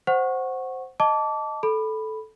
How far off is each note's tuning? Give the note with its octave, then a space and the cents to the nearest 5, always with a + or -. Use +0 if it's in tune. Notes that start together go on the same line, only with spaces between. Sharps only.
C5 +0 F#5 +0 C#6 -15
D#5 +0 A5 +0 D6 -25
A4 -10 B5 +0